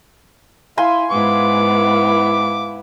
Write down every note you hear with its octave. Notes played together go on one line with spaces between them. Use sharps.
E4 F5 G#5 C6
G#2 B3 E4 D6